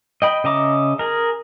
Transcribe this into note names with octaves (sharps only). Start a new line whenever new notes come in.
D#5 G5 B5
C#3 D#5 E5 A#5 D6
G#4 A#4